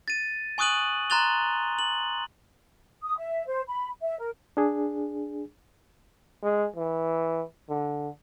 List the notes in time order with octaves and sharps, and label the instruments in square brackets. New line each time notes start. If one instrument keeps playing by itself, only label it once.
[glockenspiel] A6 D#7
G#5 C#6 D#6 F#6 D#7 F#7
A#5 C6 F#6 A6 F7 G7
F#7
[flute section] D#6
E5
C5
B5
E5
A#4
[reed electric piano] D4 G#4
[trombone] G#3
E3
D3